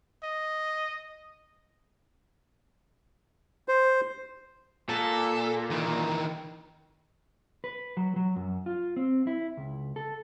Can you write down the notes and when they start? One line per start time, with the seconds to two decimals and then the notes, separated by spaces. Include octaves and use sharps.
0.23 D#5
3.68 C5
4.89 A#2 A4
5.70 D#3 E3
7.64 B4
7.97 F#3
8.16 F#3
8.36 F#2
8.66 F4
8.96 C4
9.27 E4
9.57 C#2
9.96 A4